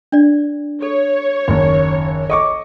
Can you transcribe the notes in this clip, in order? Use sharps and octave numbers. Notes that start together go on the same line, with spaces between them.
D4 D5
A4 C#5
F#1 D#2
A4 D#5 C#6 D6